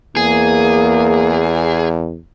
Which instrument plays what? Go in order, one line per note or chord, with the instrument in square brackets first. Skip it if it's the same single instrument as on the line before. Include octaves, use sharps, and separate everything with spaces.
[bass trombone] E2 [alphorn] A#3 [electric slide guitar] G#4